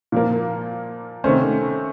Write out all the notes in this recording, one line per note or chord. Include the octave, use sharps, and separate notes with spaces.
A#2 F3 A#3
C3 D#3 A3 C#4 C5